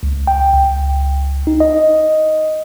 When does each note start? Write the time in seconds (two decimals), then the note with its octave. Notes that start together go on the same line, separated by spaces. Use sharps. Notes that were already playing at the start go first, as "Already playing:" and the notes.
0.03 C#2
0.27 G5
0.54 C#2
1.47 D#4
1.60 D#5